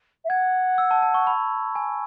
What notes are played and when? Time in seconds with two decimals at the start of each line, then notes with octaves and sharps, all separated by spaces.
0.25 E5
0.29 F#5 G#6
0.78 E6
0.91 A5
1.02 A5
1.14 C#6
1.27 B5
1.75 G#5